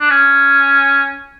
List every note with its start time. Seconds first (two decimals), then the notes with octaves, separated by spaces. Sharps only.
0.01 D4
0.10 C#4